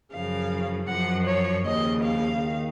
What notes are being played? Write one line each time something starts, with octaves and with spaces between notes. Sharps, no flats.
F#2 C#3 F3 F5
F#2 F3 F#5
C#5
D#2 C#3 F3 D#5
F5
D#3